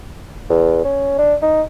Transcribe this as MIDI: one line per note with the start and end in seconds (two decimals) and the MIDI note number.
0.50 0.82 40
0.85 1.14 61
1.19 1.35 62
1.42 1.62 63